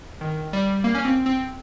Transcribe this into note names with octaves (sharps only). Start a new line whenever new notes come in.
D#3
G3
A#3
C#4
C4
C4